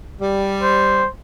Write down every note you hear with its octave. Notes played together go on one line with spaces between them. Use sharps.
G3
C5